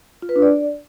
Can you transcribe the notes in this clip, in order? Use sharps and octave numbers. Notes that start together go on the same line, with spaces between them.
F4
B4
D4
D5